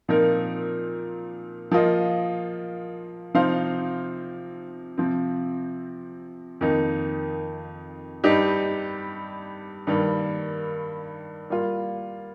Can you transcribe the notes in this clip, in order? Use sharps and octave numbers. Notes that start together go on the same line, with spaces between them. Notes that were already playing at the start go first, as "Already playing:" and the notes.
A#2 F3 C4 D#4 A#4
F3 A#3 F4 D#5
C3 F3 D#4 C5 F5
C3 F3 C4
F2 D#3 A#3 D#4
G2 G3 D#4 G4 D#5
G2 D#3 G3 A#3
G3 A#3 F4